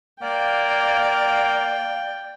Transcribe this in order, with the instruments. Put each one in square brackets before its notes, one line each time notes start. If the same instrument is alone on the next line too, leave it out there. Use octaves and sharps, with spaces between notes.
[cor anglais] A#3 [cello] D5 [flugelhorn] F5 [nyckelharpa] G5